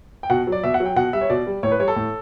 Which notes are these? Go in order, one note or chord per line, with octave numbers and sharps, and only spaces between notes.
G5
B2 F#5
F#3
D5
B2 E5
F#5
F#3
G5
B2 F#5
G3 E5
C#5
B2 D5
G3
A2 C#5
B4
G3 C#5
A4
A2